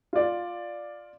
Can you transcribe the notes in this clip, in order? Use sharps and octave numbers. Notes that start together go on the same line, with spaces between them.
F4 D5